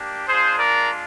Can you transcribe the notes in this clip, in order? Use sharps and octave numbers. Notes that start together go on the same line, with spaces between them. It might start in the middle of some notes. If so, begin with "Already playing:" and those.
Already playing: A#3 D4 G4
G#3 D4 F4 G#4 C5
A#4 D5